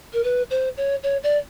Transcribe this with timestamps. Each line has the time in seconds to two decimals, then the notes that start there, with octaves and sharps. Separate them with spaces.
0.13 A#4
0.24 B4
0.50 C5
0.77 C#5
1.03 C#5
1.23 D5